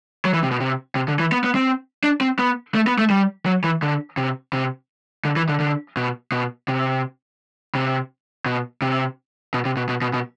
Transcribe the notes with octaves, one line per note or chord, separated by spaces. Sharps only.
F#3
E3
C3
B2
C3
C3
D3
E3
B3
B3
C4
D4
C4
B3
A3
B3
A3
G3
F#3
E3
D3
C3
C3
D3
E3
D3
D3
B2
B2
C3
C3
B2
C3
B2
C3
B2
B2
B2
B2